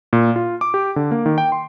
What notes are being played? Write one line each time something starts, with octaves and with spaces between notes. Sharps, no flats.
A#2
F4
D6
G4
D3
A#3
D#3
G5
C6